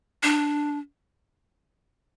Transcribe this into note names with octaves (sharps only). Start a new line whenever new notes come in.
D4